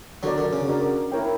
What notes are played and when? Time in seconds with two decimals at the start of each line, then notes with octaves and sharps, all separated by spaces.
0.23 D3 F#3 D4 F#4 A#4 D5
0.38 D3
0.53 C#3
0.68 D4 F#4 A#4 D5
1.12 E4 A#4 C#5 G5